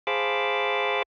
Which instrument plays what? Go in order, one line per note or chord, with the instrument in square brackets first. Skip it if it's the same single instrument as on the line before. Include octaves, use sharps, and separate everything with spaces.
[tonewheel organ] G#4 C5 F5 A5 B5 D6